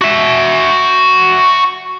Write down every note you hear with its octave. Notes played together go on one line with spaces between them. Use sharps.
F#4 E5